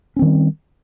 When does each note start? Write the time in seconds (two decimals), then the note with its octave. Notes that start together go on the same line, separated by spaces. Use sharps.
0.16 C#4
0.19 C4
0.22 D#3
0.25 G3